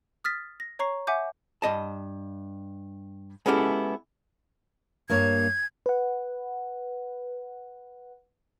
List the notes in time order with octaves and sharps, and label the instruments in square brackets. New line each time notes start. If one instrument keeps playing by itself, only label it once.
[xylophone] D#6 F6 A6 B6
A#6
C#5 A#5 C#6 C7
E5 F#5 G#5 D6 G6
[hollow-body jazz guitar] G2 D#5 A5
G#3 B3 C#4 E4 G4 A4
[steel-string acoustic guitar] G2 A#3 C#5 [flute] G#6
[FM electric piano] B4 F#5